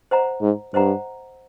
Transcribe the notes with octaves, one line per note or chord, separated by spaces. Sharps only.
C5 D#5 F#5 A#5
G#2
G2 C5 D#5 F#5 A#5